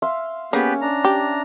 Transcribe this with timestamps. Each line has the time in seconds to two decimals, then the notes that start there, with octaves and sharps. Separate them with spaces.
0.02 E5 F5 C6
0.53 A#3 B3 C#4 G4 G#4 B4
0.81 D4 A#5
1.04 G4